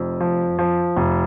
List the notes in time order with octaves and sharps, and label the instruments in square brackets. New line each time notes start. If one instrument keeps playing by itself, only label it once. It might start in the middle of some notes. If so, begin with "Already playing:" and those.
Already playing: [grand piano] F1 F2
F3
F3
F1